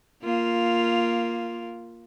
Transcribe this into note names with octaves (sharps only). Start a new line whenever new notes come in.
A#3 F4